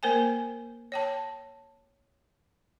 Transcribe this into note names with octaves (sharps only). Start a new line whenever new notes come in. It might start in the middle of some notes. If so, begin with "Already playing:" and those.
A#3 A#4 C5 G5 G#5
C#5 G5 A5